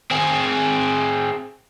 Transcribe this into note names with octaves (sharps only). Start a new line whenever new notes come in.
C4 G#4